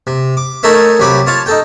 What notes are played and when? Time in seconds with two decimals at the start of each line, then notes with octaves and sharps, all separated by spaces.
0.07 C3
0.37 D6
0.63 A3 D#4 A4 A#4 C#5 E5
0.99 C2 F#3 G4 B5 D6
1.27 F4 C#5 F5 A5
1.46 D#4 A4 G5